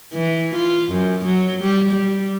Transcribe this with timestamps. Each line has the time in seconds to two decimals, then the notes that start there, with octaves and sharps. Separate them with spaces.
0.14 E3
0.56 F4
0.91 F#2
1.26 F#3
1.61 G3
1.92 G3